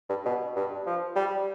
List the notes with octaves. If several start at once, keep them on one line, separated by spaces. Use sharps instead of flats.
G2
B2
G2
F3
G3